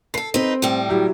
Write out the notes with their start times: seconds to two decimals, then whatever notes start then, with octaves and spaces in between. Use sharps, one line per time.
0.14 A4 B4 C7
0.34 C4 D#4 B4
0.62 A2 G3
0.89 F#3 E4 G4